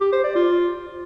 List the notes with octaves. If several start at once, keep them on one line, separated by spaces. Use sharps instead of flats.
G4
C5
D5
F4